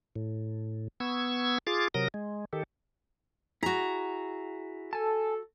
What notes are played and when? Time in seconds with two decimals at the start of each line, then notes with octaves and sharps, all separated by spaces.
0.16 A2
1.00 B3 C#6 E6 G#6
1.67 F4 G#4 D6 A6
1.94 C3 F#3 A#4 D#6 A#6
2.14 G#3
2.53 D#3 G4 A4
3.63 E4 F#4 G#4 A#5
4.93 A4 G#5 A5